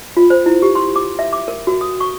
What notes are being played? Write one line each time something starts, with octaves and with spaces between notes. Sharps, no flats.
F4
C5
E4
G4
C6
D6
E5
D6
A#4
F#4
D#6
C#6